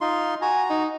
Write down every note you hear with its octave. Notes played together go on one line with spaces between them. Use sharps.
D#4 F4 C6
F#4 G#5 A#5
D#4